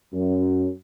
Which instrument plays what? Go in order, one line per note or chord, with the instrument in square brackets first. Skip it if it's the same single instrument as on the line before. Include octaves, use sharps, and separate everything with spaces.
[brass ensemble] F#2